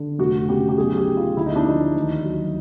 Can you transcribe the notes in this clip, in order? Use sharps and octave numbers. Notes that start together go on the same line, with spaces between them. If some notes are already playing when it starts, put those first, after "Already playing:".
Already playing: D3
F1 F#4
C#3 G4
G4
B1 G#4
G4
F#3
F4
D2 E4
D#4
D4
F3 D#4
D#2
F#3